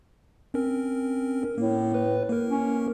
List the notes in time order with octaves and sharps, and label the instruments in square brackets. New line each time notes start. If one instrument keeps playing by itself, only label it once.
[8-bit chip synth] C4 C#4 A#4
[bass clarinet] A2 [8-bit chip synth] A#3
[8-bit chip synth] B4
A#3 A#4
[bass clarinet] C#4